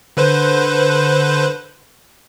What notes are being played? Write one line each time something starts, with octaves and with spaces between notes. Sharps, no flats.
D3 B4 C5